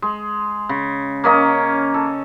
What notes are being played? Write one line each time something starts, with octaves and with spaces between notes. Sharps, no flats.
G#3
C#3
A#3 C#4 D#5 A#5
A4